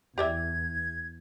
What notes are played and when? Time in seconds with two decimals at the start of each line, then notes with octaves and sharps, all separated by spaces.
0.18 E2 G4 D5 E5 G#6